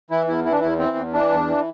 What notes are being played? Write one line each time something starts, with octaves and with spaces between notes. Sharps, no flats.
E3 E4
E2 E4
E3 E4
D4
E2 E4
E3 C4
E2
E3 D4
E2
E3